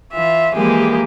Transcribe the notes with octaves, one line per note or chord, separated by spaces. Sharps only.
E3 F4 E5
E3 F3 G#3 A#3 G4 G#4